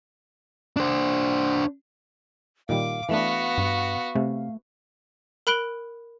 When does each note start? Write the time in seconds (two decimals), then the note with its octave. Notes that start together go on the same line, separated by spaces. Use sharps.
0.77 D4 C5
2.69 A#2 D#3 G3 F5 D6
3.09 E3 A3 B3 D4 F#4
3.58 G2
4.15 C3 A3
5.47 A#4 B5 F#6 D7 G7